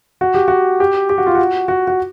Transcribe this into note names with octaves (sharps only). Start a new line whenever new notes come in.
F#4
G4
F#4
G4
G4
F#4
F4
F#4
F#4
F#4